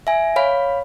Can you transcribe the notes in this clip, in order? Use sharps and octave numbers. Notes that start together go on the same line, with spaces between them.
E5 G#5
C#5 F5 B5